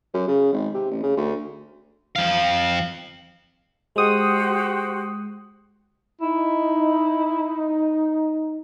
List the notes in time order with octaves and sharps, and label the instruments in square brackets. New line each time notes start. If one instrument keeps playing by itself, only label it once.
[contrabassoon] F#2
C#3
G#1
C3
A1
C#3
D2
[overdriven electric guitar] F2 F5
[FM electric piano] G#3 D#6 [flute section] F#4 G4 C5
[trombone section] D#4 [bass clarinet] E4